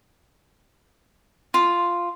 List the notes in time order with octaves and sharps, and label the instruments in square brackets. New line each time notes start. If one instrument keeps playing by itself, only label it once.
[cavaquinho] F4